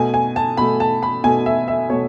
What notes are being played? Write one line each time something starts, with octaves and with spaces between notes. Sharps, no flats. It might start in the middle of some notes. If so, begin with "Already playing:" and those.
Already playing: B2 A3 G#5
G#5
A5
B2 A3 B5
A5
B5
B2 A3 G#5
E5
E5
B2 A3 C#5